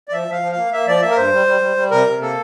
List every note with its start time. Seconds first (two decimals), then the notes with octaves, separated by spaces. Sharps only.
0.08 D5
0.12 F3 E5
0.28 F3 F5
0.42 F3
0.52 A#3 F5
0.72 A#3 E5
0.87 F3 D5
1.02 A#3 E5
1.11 A#4
1.17 G2 C5
1.32 G3
1.47 G3
1.61 G3
1.77 G3
1.91 C3 A#4
2.07 C3
2.22 A#3 A4